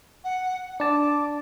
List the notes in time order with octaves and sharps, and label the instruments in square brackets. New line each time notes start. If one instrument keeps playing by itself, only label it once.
[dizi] F#5
[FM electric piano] D4 A5 [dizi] D6